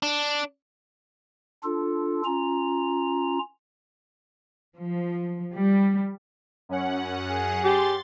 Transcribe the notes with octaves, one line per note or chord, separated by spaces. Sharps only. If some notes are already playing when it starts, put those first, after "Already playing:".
D4
D4 F4 A4
C#4 F4 A#5
F3
G3
F#2 C#4 F#5
G#4
G4 C6 A6